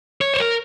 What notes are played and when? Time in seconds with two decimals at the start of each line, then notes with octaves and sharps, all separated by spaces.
0.21 C#5
0.34 C5
0.40 A#4